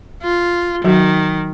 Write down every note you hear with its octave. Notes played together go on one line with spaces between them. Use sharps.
F4
D#3 F#3 F#4